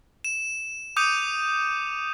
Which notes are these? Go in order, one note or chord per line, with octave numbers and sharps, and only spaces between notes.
E7
D6 D#6 G6 C#7 D#7 F7